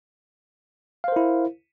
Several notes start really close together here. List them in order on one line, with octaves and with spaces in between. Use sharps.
F5 C5 A#4 E4